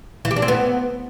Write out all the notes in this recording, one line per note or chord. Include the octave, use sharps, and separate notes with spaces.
E3
G4
D4
C4
B3